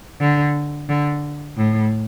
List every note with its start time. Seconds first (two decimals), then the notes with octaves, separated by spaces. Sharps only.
0.20 D3
0.89 D3
1.57 A2